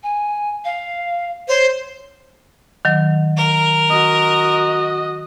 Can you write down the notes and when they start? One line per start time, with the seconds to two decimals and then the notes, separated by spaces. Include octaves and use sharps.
0.03 G#5
0.64 F5
1.48 C5 C#5
2.85 D#3 F#3
3.37 A#4
3.90 F#4 D#5